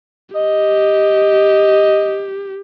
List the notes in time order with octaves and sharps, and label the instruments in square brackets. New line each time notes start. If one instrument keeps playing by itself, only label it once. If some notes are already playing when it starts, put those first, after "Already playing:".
[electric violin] G4 [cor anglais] D#5